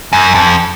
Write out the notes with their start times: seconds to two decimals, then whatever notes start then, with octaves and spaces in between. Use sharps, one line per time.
0.13 F#2
0.35 F2